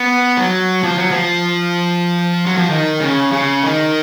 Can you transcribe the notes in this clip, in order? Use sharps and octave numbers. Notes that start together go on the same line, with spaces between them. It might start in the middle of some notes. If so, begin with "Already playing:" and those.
Already playing: B3
F#3
F3
F#3
F3
F#3
F3
D#3
C#3
C#3
D#3